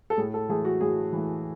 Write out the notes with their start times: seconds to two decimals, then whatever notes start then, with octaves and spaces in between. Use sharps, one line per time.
0.10 A4
0.17 A2 G#4
0.34 A4
0.49 E3 A3 G#4
0.65 F#4
0.81 A2 G#4
1.12 E3 A3